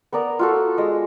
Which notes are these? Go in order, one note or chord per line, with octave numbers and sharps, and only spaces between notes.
B3 A#4 D5 A#5
F4 F#4 A4
G#3 D#5